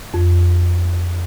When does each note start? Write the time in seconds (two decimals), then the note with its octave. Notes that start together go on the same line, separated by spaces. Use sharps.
0.14 F2